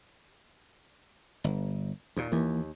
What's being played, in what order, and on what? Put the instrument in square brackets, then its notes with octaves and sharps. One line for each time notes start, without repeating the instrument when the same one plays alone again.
[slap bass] G1
D#2 A#2
[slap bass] D#2 [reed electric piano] E3 A#3